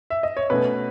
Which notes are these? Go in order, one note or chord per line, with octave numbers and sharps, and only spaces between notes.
E5
D#5
C#5
B2 A3 C#4 B4